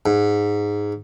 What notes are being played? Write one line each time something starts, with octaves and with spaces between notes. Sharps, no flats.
G#2